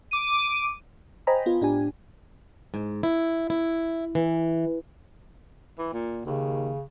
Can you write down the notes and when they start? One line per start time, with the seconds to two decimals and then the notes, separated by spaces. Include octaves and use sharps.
0.11 D6 D#7
1.27 C5 D#5 G5 G#5 A#5 B5
1.46 B3 F4
1.61 A2 D4 G4 G#5
2.74 G#2
3.03 E4
3.50 E4
4.15 E3
5.78 E3
5.93 A#2
6.26 D#2 C#3